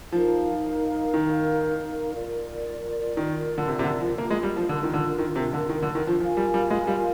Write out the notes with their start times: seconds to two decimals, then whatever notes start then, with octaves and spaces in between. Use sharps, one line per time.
0.12 F3 D#4 A#4 F5
1.14 D#3
2.15 F4 A#4 D5
3.17 D#3
3.58 D3
3.68 C3
3.79 C3
3.84 D3
4.01 F3
4.18 A#3 D4 F4 A#4
4.31 G#3
4.43 G3
4.56 F3
4.69 D3
4.83 D#3
4.93 D3
5.19 D#3
5.36 C3
5.53 D3
5.69 D#3
5.82 D3
5.95 D#3
6.07 F3
6.20 F3 F4 A#4 F5 G#5
6.37 G3
6.54 G3
6.70 G#3
6.87 G3